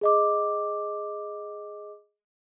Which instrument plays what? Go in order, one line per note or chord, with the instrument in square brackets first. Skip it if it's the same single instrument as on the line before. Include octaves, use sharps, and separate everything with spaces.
[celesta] G#4 D#5 D6